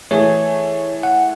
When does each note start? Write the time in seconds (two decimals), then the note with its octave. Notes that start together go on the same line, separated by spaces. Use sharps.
0.11 E3 A3 G#4 C#5
1.03 F#5